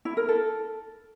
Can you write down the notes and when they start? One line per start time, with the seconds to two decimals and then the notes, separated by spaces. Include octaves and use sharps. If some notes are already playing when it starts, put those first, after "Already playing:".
0.05 E4
0.17 A#4
0.29 A4